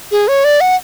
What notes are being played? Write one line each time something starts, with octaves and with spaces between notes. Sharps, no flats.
G#4
C#5
D5
F#5